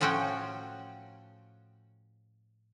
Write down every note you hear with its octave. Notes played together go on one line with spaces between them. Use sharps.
A2 F3 C#4 F#4 G5